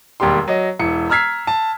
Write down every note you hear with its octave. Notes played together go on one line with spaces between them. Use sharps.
E1 D#2 G3 G4 C6
F#3 D#5
E1 E3 C#7
A#5 E6 F6 G#6 B6 C7
A5